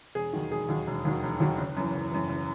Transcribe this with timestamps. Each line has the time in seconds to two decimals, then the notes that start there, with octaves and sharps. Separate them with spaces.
0.15 E1 G#4
0.33 D#2 D#3 F#3
0.51 E1 G#4
0.69 D#2 D#3 F#3
0.87 E1
1.05 D#2 D#3 F#3
1.23 E1
1.40 D#2 D#3 F#3
1.58 F#1
1.77 F#2 E3
1.94 F#1
2.11 F#2 E3
2.29 F#1